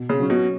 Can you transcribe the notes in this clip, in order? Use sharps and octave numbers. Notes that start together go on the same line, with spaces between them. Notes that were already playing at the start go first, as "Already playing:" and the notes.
Already playing: B2
C#3
F#3 C#4
B2